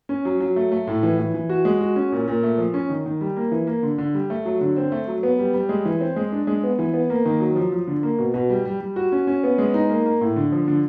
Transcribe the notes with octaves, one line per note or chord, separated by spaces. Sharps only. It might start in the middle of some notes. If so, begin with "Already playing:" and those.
C#4
F#3
F#3
A3
A3
A2
E3
E3
E3
F#4
G#3
F#4
C#4
A#2
A#2
A3
F3
C#4
D#3
D#3
G3
A#3
E3
A#3
D3
D3
G3
A3
F#3
D3
C4
A3
F#3
B3
G3
G3
G#3
E3
C4
G#3
D4
G#3
B3
E3
B3
A#3
D#3
F#3
F3
F3
D3
A#3
B2
B2
G3
G3
G3
F#4
C#4
C#4
B3
G#3
D#4
A#3
A#3
A2
D3
F3
D3